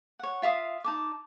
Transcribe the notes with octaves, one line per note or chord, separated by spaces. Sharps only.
C#5 F#5
F4 E5 F5 D#6
D#4 A5 D6